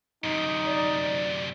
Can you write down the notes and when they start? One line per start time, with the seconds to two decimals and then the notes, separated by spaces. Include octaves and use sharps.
0.24 F#2 C3 D#4
0.65 D5